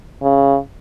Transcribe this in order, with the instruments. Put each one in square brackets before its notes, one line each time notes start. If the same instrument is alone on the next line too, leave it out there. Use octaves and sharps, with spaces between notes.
[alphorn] C#3